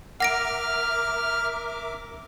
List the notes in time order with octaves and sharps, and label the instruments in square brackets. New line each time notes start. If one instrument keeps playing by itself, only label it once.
[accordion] A#4 E5 D6 [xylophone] F#5 A#6 D7 [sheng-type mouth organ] F6